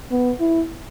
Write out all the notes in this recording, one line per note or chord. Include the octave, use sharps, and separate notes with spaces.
B3
E4